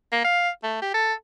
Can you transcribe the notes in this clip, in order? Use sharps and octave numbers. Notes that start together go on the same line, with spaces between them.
A#3
F5
A3
G4
A4